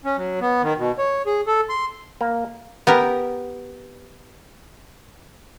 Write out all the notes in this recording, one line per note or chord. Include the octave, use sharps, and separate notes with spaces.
C#4
F#3
B3
D#3
B2
C#5
G#4
A4
C6
A#3
B3 G4 A#4